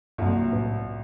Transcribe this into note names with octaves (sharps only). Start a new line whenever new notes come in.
C2 G2 A#2 F#3
A2